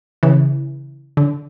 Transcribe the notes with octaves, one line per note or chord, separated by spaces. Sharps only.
C#3 E3
D3